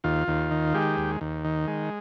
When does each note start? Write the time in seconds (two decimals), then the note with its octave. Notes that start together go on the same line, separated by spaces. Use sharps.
0.04 D#2 F4
0.28 D#2
0.51 D#3
0.74 G#3 G4
0.97 D#2
1.21 D#2
1.45 D#3
1.67 G#3